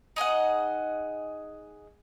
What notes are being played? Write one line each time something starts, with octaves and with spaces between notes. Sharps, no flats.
D#4 G#4 D#5 F#5